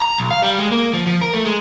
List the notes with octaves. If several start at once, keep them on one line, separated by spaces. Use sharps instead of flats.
A#5
B1
F5
G3
G#3
A#3
F3
F3
A#4
A3
G#3